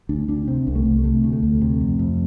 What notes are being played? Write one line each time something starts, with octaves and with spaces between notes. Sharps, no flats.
D2 D4
D2 D4
C3 C4
C2
A3
C2
C3 A3
D2
A3
D2
C3
F2
F2